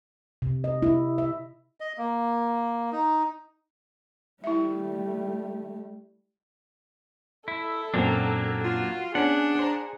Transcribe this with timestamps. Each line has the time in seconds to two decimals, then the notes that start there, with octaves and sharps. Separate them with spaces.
0.42 C3
0.64 D#5
0.82 E4
1.18 E5
1.80 D#5
1.98 A#3
2.92 D#4
4.44 G3 A3 E4 E5
7.48 E4 A4
7.94 F#2 A#2 F#3 A#3 C4 D4
8.64 F4 F#4
9.15 B3 C#4 D4 G#4 F#5
9.59 C5 A#5